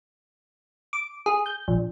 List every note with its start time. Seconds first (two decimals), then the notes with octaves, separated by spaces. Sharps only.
0.93 D6
1.26 G#4
1.46 G6
1.68 A#1